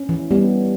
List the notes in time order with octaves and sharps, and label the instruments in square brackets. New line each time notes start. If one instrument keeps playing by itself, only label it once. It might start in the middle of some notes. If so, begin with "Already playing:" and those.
Already playing: [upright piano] C#4
[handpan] E3
G3 B3